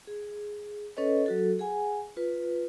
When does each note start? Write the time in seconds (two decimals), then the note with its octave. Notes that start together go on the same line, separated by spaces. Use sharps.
0.07 G#4
0.97 C#4 A4 B4 C#5 D#5
1.26 F#3 F#4 A4
1.59 G#4 F#5 G#5
2.16 F4 B4